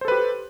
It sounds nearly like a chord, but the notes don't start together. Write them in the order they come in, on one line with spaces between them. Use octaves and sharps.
C5 A4 B4 G4